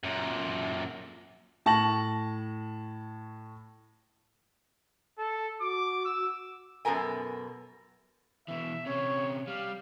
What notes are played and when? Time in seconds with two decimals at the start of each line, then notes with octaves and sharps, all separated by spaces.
0.03 F#2 A#2
1.66 A2 A5 C#6 A#6 F#7
5.18 A4
5.61 F#4 D6
6.05 E6
6.85 F#2 B2 A4 A#4 G#5
8.48 B2 E3 E5
8.86 C3 C#4 C#5
9.47 G3 F5